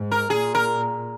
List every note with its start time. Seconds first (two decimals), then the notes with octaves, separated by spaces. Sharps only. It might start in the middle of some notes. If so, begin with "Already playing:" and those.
Already playing: G#2
0.11 A#4
0.30 A#2 G#4
0.55 A#4